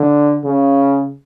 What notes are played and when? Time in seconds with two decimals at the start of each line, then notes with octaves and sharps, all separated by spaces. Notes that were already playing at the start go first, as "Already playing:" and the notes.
Already playing: D3
0.44 C#3